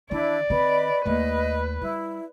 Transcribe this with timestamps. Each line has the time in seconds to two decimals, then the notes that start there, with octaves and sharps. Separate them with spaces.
0.11 D#3 E3 D4 E4 D5
0.50 D#3 C4 B4 D#5 B5
1.06 D#2 A3 B4 D#5
1.82 G3 E4